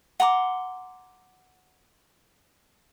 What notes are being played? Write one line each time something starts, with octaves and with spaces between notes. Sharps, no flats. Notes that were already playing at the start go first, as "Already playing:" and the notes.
F#5 A#5 C6 D6